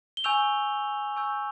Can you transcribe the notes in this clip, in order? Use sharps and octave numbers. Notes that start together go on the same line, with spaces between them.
G7
G#5 C#6 E6 G6 F7
G#5 C#6 E6 G6